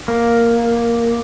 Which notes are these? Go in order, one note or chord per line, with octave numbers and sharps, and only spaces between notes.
A#3